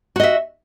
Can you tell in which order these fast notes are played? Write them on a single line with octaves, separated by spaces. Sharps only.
F#4 D#5 E5